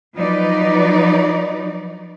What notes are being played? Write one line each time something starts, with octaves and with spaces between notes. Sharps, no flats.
F3 F#3 D#4 B4 D5